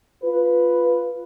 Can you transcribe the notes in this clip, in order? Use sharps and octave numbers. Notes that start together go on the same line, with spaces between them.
F4 B4